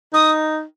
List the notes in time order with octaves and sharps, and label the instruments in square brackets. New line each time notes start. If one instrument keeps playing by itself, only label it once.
[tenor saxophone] D#4 [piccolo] D#6